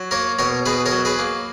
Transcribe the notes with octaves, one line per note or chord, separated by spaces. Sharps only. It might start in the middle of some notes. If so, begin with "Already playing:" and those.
Already playing: F#3
A#3 A#4 C#5
B2 A#4 C#5
B2 G#4 B4
A#4 C#5
F#3
G#4 B4
A#3